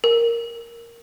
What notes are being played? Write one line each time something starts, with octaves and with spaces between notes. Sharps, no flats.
A#4